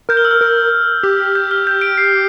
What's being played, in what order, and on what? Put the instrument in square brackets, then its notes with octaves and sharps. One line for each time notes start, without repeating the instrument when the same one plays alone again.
[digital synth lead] A#4 [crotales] G6
[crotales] F6
E6
F6
[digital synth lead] A#4
G4
[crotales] G6
F6
G6
D7
C7